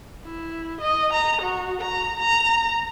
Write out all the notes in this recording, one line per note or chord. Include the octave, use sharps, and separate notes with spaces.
E4
D#5
A#5
F#4
A#5
A#5